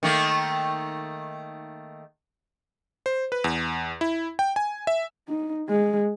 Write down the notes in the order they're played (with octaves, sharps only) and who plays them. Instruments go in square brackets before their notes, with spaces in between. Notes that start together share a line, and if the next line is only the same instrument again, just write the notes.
[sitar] D#3 A3 A#3
[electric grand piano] C5
B4
E2
E4
G5
G#5
E5
[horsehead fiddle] D#4
G#3